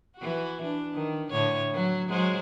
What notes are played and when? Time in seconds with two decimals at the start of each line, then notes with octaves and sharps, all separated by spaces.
0.17 E3 F#4
0.62 D4
0.94 D#3
1.31 A2 D3 C#5
1.74 F#3
2.09 F#3 G#3 C5